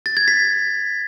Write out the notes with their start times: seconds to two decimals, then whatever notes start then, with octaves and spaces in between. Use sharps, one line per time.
0.06 A6
0.17 G#6
0.28 B6